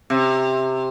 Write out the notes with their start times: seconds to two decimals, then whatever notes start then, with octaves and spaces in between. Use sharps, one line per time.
0.10 C3